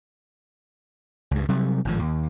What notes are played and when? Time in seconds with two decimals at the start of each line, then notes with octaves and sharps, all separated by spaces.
1.31 C#2 G2
1.49 C3 F#3 G3
1.85 G#1 A2 F3
1.99 D#2